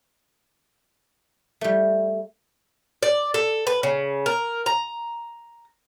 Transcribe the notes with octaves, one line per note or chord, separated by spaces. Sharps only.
G3 A3
D5
A4
B4
C#3
A#4
A#5